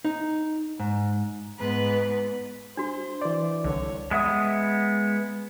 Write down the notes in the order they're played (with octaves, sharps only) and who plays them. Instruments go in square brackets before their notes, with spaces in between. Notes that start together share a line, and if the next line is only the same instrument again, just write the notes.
[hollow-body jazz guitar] D#4
G#2
[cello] G#2 B3 [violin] B4
[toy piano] D4 F#4 [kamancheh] C5
[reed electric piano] E3 D5
[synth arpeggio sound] C2 D3 [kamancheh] C#5
[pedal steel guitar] G#3 B3 E5 D#6